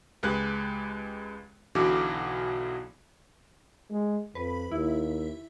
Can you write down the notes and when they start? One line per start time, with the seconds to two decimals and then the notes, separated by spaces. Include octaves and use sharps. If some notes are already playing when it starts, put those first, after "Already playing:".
0.23 C#2 G#3 G4 B4 F#6
1.75 B1 B2 D3 E3 F#4 D6
3.91 G#3
4.35 F2 B4
4.72 D#2 E4